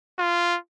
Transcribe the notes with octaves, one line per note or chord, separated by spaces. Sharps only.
F4